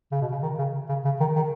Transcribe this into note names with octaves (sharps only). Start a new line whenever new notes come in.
C#3
B2
C#3
D#3
C#3
C#3
C#3
D#3
D#3